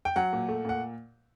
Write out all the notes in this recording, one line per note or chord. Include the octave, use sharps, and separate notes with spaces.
G5
F#3 F#5
A#2
A3
A#2 F#5